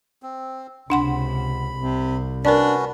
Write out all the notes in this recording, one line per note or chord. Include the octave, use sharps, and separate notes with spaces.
C4
C#2 C3 D4 F#5 B5 C6
C2 C3
C#4 D4 F#4 A#4 B4 D5